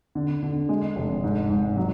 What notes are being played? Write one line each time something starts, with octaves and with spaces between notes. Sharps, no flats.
D3
D3
G#3
F1
G#2
G#2
F#3